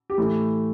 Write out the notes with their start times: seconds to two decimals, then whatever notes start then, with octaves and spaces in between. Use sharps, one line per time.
0.10 G4
0.18 A2 E3 A3